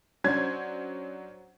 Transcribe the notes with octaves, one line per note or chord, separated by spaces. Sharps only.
F#3 C#4 D4 C5 G#6